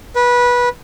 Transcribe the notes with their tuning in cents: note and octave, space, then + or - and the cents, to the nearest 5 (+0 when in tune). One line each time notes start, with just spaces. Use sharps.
B4 -20